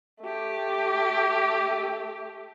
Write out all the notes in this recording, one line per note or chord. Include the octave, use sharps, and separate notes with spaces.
A3 G4